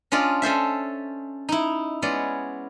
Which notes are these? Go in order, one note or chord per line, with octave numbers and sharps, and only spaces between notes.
C#4 D4 F4 D5 D#5
C#4 A4 C5 E5
D#4 E4
G#3 B3 C#4 D5